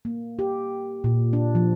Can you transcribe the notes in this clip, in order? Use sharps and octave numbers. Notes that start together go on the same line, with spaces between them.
A#3
G4
A#2
D4
F3